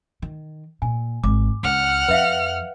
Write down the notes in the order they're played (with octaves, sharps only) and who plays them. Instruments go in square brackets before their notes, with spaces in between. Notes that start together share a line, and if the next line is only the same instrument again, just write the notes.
[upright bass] D#3
[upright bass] A#2 [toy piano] G#5
[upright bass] G#1 [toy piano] D6
[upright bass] C#2 [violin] F#5 F6
[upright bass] F2 [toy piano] B4 E5 F5